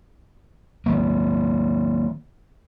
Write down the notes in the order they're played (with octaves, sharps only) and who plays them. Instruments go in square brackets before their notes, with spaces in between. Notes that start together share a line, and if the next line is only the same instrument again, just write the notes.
[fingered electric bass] D#3 F#3 A#3